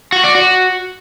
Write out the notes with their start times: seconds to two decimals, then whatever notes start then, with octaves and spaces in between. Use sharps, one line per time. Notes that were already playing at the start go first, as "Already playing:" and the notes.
0.12 F#4
0.24 D5
0.35 F#4